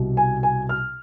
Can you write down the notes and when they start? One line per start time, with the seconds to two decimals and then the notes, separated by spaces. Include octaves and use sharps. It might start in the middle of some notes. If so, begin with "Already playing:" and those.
Already playing: C2 B2
0.17 G#5
0.43 G#5
0.69 F6